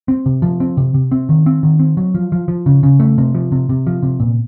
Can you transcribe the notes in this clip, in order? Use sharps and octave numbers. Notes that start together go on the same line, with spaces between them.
C4
C3
F3
C4
C3
C3
C4
D#3
C4
D#3
C4
F#3
F3
F3
F3
C#3
C#3
A3
C3
F3
C3
C3
F3
C3
A#2